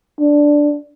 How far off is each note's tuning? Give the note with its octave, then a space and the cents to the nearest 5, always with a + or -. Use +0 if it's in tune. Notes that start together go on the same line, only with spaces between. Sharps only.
D4 +0